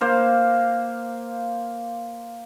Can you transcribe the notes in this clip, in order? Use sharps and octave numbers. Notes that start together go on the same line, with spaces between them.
A#3 C5 F5